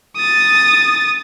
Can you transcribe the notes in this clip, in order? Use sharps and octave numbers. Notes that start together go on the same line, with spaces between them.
D#6 A6